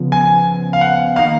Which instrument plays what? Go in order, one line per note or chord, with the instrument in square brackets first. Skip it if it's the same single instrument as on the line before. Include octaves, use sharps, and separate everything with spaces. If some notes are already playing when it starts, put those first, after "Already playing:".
Already playing: [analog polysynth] C#3 F3 B3
[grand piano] G#5
F5
F#5
[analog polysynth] D#3 A#3 D#4 [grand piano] F5